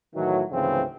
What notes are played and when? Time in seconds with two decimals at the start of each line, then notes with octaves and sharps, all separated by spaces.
0.14 A2 D#3 E3 F#3
0.51 D2 G#2 C#3 E3 F3 C4